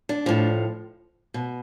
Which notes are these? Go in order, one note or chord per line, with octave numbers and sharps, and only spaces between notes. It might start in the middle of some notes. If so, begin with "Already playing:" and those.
D4
A2 F3
B2